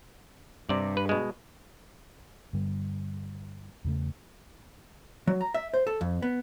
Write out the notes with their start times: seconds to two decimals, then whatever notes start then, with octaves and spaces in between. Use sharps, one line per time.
0.69 G2 C3 D5
0.97 B4
1.09 B2 G#3
2.53 G2 D3 G3
3.84 E2 C#3 A3
5.27 F#3
5.41 A#5
5.54 E5
5.74 C5
5.87 A4
6.01 F2
6.22 B3